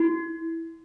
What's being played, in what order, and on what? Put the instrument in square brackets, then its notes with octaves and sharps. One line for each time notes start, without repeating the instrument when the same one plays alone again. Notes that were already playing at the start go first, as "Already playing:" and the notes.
Already playing: [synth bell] E4